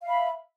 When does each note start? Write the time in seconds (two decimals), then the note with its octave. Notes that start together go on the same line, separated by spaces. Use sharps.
0.02 F5
0.05 E5
0.08 B5